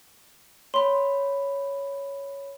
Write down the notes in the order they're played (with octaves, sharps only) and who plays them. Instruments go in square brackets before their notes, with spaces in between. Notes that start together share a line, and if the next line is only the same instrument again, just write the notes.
[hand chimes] C#5 B5 [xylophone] C6